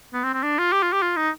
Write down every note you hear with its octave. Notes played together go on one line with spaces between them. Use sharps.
B3
C4
C4
D4
F4
G4
F4
G4
F4
D#4